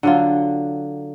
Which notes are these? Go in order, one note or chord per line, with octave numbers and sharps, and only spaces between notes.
D3 F#3 F4